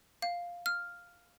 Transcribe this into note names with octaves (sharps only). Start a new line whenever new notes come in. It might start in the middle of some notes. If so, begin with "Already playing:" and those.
F5
F6